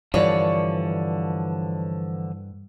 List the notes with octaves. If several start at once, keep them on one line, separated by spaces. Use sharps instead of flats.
G2 D3 E3 F3 C#5 D5